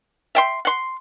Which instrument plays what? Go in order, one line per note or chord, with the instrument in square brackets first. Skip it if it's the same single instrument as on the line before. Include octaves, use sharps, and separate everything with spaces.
[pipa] E5 G5 C6
F#5 C6